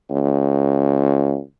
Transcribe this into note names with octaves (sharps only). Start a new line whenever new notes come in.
C#2